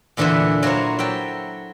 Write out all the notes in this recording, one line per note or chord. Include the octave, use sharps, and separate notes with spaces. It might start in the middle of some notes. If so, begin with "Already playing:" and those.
E2 A#2 D3 E3 B3 E5
F#3 A#3 E4 C5 C#5
F#3 E5 G5 A5